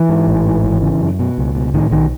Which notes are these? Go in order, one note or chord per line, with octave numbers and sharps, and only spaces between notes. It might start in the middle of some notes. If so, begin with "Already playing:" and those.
Already playing: E3
G#2
A1
G#2
G#1
C#3
F#2
B2
C#2
B2
A2 D#3
B1 D#3